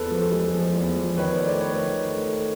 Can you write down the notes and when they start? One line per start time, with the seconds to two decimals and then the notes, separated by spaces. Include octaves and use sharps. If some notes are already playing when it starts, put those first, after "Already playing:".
Already playing: E2 A4 B4
0.11 F3
0.32 G#3
0.53 F3
0.75 E2
0.96 F3
1.17 D#3 B4 C#5
1.39 A3 C5 D5
1.60 A3 B4 C#5
1.82 D#3
2.03 A3
2.25 A3